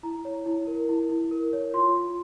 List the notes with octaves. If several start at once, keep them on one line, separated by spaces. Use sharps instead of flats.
E4 A#5
C#5
E4
A#4
E4
E4
A#4
C#5
F4 C6
F4